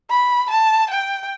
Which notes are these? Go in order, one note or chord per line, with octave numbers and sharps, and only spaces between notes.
B5
A5
G5